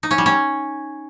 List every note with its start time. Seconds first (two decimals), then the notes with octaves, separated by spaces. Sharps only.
0.03 D#4
0.11 C#4
0.18 G3
0.26 C#4